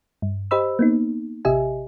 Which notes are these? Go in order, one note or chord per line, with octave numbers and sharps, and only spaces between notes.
G2
G4 C5 D#5 B5 E6
A#3 B3 D#4
A1 C3 G4 D#5 E5 G#5